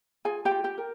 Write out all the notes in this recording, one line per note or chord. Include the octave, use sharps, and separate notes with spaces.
F4 G#4 G#5
G4 G5
F4
G4 G5
A#4